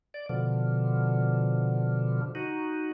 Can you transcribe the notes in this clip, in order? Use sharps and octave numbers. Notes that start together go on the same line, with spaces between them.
D5
B2 D3 F3
D#4 F#4